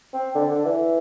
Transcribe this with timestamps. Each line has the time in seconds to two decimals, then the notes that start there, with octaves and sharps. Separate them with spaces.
0.14 C4
0.35 D3
0.51 D3
0.65 E3